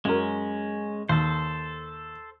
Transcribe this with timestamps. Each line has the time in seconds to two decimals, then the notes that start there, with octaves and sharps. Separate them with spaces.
0.05 F#2 G#3 C#4 A#4
1.09 D#2 A4 C5